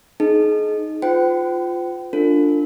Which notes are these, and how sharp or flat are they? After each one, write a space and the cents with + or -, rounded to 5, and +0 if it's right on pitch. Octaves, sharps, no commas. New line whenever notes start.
D#4 +0 G#4 +30
F4 +5 C5 -40 G5 -35
D4 +0 F4 +0 A4 +45